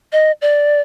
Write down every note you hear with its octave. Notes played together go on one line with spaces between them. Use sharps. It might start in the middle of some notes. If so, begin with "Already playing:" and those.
D#5
D5